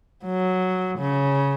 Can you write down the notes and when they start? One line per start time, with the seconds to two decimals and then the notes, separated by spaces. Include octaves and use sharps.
0.25 F#3
0.98 C#3